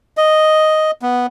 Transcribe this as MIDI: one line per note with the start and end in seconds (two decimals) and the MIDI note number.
0.17 0.91 75
1.02 1.26 59